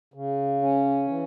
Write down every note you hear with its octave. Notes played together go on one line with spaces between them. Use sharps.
C#3
C#4
E3